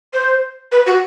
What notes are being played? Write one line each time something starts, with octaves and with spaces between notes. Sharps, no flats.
C5
B4
F#4